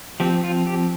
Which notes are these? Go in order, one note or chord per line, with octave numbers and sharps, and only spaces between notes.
F3 C4 G4
F4
G4